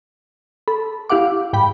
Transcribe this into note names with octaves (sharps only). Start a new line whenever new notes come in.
A4 B5
E4 G4 F5 F#5 D6
G#2 G5 B5